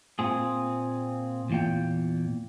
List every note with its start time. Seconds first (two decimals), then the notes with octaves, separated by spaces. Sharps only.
0.19 A#2 C4 G#4
1.50 E2 A#2 G5